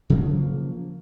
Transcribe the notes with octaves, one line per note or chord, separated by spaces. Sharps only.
C#3 F3 F#3 A#3